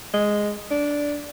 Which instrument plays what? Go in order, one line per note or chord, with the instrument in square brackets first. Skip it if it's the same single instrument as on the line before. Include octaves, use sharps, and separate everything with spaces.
[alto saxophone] G#3
D4